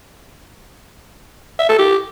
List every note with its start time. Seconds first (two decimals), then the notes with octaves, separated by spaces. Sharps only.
1.59 E5
1.69 A4
1.79 G4